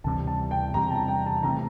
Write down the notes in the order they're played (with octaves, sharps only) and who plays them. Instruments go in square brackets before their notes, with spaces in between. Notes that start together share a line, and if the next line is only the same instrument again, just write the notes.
[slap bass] D2 C3 E3 G3 [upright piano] A5
[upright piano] A5
G5
[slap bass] E2 C3 G3 [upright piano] A#5
[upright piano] A5
G5
A5
[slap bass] C3 E3 A3 [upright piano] A#5